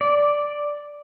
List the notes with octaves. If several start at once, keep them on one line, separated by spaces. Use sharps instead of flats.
D5